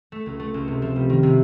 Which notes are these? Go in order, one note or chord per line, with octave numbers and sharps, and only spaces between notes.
A3
C#2
A3
C#2
C3
F3
G3
D#3
C3